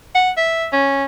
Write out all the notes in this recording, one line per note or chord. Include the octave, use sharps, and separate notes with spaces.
F#5
E5
C#4